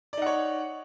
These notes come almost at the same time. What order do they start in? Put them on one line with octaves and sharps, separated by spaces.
D5 D#4 F#5 C#5